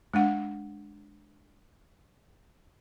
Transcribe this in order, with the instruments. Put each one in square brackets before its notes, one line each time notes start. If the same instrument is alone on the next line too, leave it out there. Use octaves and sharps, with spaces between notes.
[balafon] G#3 D4 F#5